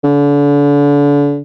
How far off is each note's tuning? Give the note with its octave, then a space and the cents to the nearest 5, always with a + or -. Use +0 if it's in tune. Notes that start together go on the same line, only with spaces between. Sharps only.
D3 -35